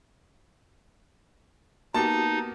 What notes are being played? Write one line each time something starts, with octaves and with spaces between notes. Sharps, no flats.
A#3 B3 D#4 F#4 G4 A5